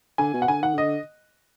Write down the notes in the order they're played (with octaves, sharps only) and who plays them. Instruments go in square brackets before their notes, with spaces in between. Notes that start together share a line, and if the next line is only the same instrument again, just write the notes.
[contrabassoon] D3 [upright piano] G#5
[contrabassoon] B2
[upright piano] F#5
[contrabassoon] D3 [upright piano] G#5
[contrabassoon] D#3 [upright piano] F#5
[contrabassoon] D3 [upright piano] D#5